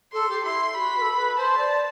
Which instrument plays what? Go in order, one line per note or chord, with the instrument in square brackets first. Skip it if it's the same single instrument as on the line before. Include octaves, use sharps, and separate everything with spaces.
[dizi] A4 [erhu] C6
[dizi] G4
[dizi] E4 [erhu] C6
[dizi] F#4 G4 [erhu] B5
[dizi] B4
A4
B4
[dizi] C5 [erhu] A5
[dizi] D5